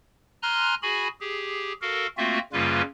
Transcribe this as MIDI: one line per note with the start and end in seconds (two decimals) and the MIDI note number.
0.43 0.75 80
0.43 0.75 82
0.43 0.75 84
0.43 0.75 89
0.43 0.75 90
0.82 1.08 66
0.82 1.08 68
0.82 1.08 80
0.82 1.08 83
1.21 1.73 67
1.21 1.73 68
1.81 2.07 66
1.81 2.07 69
1.81 2.07 70
1.81 2.07 77
2.17 2.39 57
2.17 2.39 58
2.17 2.39 60
2.17 2.39 65
2.17 2.39 66
2.17 2.39 76
2.53 2.82 42
2.53 2.82 49
2.53 2.82 55
2.53 2.82 58
2.53 2.82 65
2.53 2.82 71